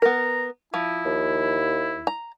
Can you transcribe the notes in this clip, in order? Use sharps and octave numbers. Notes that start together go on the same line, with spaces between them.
B3 A#4 A#5
F3 E4
D#2
A#5